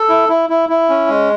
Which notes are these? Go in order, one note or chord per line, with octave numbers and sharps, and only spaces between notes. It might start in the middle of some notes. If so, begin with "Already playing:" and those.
Already playing: A4
E4
E4
E4
E4
C#4
G#3